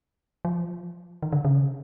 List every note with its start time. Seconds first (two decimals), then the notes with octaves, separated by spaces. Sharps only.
0.45 F3
1.23 D#3
1.32 D3
1.45 C#3